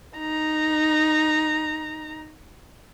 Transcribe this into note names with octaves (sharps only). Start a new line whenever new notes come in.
D#4 A#5